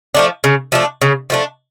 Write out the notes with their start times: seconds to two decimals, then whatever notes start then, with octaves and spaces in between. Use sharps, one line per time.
0.14 F3 A3 D4
0.44 C#3
0.72 F3 A3 D4
1.02 C#3
1.30 F3 A3 D4